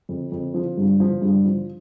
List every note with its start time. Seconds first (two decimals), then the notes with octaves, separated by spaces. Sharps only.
0.09 F2
0.32 F2
0.54 F3
0.77 G2
1.00 F3
1.22 G2
1.45 F3